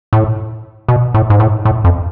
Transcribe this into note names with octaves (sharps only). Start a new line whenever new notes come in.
A2
B2
A2
G#2
A2
A2
F2